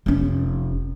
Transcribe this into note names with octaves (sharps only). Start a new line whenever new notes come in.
F1 C#4